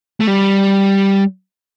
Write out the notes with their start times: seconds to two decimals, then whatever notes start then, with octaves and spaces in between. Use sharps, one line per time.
0.20 A3
0.27 G3